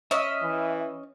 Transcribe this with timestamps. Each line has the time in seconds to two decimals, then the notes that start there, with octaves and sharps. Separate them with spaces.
0.11 C#4 D#5 E5
0.42 E3